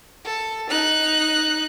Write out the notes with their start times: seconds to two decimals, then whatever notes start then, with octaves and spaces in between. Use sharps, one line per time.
0.25 A4
0.69 D#4 F#6